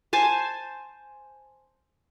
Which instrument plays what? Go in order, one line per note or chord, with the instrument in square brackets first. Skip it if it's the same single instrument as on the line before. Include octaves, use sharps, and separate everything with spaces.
[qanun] C5 G#5 A5